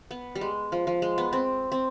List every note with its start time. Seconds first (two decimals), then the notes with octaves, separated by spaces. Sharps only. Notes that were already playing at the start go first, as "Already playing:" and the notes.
0.11 B3
0.35 G3
0.41 G#3
0.72 F3
0.87 F3
1.02 G#3
1.18 B3
1.33 C4
1.72 C4